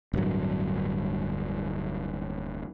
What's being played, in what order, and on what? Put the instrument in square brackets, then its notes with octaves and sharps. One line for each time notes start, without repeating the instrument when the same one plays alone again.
[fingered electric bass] D1 G2 F#3